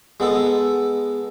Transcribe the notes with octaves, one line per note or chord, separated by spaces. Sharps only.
G#3 B3 A4